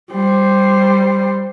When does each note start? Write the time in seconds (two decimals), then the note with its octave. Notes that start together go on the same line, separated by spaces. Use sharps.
0.11 G3 C5